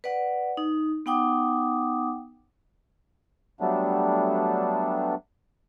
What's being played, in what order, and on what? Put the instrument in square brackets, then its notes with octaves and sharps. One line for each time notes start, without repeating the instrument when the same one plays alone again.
[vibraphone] B4 D5 F#5
D#4
B3 D#4 F#5 G5 D6 D#6
[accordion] F#3 G3 A3 B3 D4